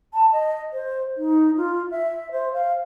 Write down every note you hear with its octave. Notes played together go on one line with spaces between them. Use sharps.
A5
D#5
C5
D#4
F4
E5
C5
F5